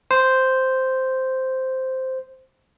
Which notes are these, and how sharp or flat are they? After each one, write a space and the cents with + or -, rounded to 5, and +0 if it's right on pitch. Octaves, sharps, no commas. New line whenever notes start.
C5 -5